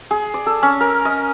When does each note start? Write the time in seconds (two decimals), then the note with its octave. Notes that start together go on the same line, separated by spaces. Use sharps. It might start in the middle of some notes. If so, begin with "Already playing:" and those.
0.11 G#4
0.34 D5
0.46 A4
0.63 C#4
0.81 A#4
1.05 D#5